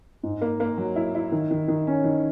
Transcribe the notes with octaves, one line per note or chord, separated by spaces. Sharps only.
G#2
A#3
A#3
F#3
E4
E4
D#3
D#3
D#3
C#4
D#3